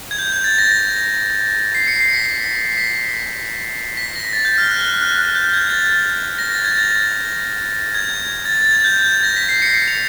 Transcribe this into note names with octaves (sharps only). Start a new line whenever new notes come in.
G#6
G6
G#6
A6
A#6
C7
C#7
C7
B6
B6
B6
A#6
A6
G6
F6
F#6
F#6
F#6
F#6
G6
G#6
A6
A#6
A6
G#6
A6
G#6
A6
A6
G#6
G6
A6
G6
G#6
A#6
B6
C7
C#7
C#7
F7